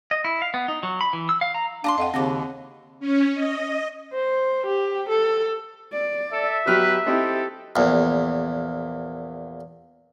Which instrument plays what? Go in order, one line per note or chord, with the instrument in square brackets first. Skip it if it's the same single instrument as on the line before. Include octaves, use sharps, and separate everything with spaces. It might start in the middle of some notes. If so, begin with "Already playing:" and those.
[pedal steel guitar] D#5
E4
F5
B3
D#4
F#3
B5
E3
E6
F5
A#5
[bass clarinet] D4 [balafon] F5 [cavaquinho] A5 A#5 C6
[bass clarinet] F2 [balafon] D#5 F5 F#5
[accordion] D#2 [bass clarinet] C#3 [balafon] C4 D6 [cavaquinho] F#4 D#5 A5
[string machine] C#4
D#5
[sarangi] C5
G4
A4
[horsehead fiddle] D5
[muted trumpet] A4 [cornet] E5
[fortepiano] B2 F#3 F6 [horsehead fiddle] G4 [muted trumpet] B4
[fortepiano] C4 D#4 E4 [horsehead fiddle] G4 [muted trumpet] A4
[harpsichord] A#1 E2